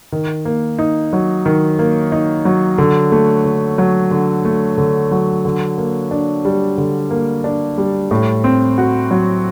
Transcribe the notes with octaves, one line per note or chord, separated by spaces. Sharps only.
D#3
A#3
D#4
F#3
D#3
A#3
D#4
F#3
D3
A3
D3
F#3
D3
A3
D3
F#3
D3
A#3
D4
G3
D3
A#3
D4
G3
A2
C4
F#4
F#3